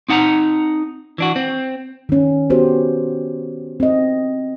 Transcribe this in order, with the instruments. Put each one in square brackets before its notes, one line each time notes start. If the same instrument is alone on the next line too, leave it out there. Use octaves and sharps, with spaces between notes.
[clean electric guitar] C4 D#4 F#5 A5 A#5
E3 D4 F#4
C4
[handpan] D#3 C#4
B3 F#4 G4 C5
C4 D#5